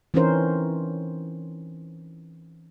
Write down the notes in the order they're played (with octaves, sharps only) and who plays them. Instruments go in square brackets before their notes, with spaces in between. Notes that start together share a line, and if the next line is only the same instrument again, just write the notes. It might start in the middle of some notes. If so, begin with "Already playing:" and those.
[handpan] E3 C4 C#4 D#4 A#4 C5